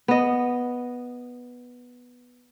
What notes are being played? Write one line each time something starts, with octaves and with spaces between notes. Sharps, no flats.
B3 D#5